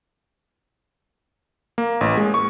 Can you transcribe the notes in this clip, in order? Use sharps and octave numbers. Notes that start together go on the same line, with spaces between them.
A#3
A1
G#3
C#6